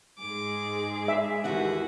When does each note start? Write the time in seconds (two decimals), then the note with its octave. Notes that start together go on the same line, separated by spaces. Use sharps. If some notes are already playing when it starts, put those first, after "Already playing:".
0.19 G#2 G#4 D6
1.08 E5
1.44 D#2 E3 F#4 F#5